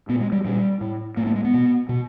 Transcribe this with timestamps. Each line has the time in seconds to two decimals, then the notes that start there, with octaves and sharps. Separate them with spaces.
0.09 A#2 B3
0.20 G#3
0.32 G3
0.45 A#2 G3
0.81 A2
1.17 A2 A#3
1.27 A3
1.35 G#3
1.44 B3
1.54 B2
1.89 B2